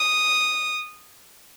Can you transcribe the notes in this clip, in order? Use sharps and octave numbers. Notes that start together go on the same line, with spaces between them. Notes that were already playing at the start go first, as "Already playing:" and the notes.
Already playing: D#6